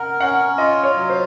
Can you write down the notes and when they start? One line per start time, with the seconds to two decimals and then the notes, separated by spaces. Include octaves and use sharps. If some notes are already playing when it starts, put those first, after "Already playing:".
Already playing: A#4 F#5
0.20 C#4 F#5
0.58 F4 D#5
0.83 C#5
0.96 F#3
1.10 C5